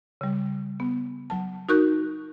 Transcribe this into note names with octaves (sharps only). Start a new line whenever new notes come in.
C#3 G3
B3
F#3 A5
D#4 F#4 A#4 C#6 F#6 G6